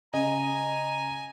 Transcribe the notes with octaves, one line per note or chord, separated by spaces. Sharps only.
C#3 D#5 G#5 A#5